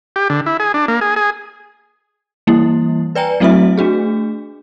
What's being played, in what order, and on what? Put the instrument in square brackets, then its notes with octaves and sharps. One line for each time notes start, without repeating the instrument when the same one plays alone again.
[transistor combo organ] G4
D3
E4
G#4
D4
A#3
G#4
G#4
[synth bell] E3 G3 A#3 E4
B4 D5 G5 G#5 A#5
F#3 A3 C4 E4 F#4 E5
A3 D4 F#4 G#4